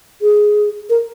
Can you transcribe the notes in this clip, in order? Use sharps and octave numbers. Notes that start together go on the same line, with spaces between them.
G#4
A#4